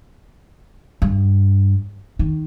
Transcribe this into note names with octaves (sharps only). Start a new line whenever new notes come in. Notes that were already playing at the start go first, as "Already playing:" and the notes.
G2
D#3